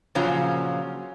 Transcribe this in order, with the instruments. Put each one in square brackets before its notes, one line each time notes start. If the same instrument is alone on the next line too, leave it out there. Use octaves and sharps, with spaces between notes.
[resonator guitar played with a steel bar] A#2 C#3 F3 F#3 C#4 F4